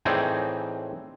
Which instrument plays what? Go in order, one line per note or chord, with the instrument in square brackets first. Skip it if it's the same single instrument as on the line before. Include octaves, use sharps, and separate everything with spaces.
[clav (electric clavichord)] A2 E3 C4 D#4 G#4 D5